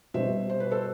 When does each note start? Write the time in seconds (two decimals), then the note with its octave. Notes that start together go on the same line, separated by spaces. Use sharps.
0.14 B2 G3 C4 C5 E5
0.49 C5
0.60 B4
0.70 A4 C5